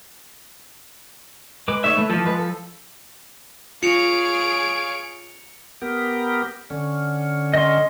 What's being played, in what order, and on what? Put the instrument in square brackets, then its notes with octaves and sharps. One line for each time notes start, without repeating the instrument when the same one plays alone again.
[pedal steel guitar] G#3 B4 D6
[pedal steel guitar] A3 D#4 C#5 [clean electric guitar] E5
[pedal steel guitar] A3 B4
[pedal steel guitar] E3 A4 [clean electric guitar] F3
[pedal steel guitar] G#3 B4
A4
[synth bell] F4 [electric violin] G#4 D7 [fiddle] C#5 F5 [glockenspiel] C#7 F7
[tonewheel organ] B3 G4 A#4
D3 C#4
[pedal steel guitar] D#5 C6